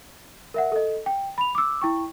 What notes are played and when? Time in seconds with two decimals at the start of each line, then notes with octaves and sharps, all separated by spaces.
0.54 A#4 E5 F#5
0.72 A4 D#5
1.06 G5
1.38 B5 F7
1.55 D6 E6
1.81 E4 G5 C#6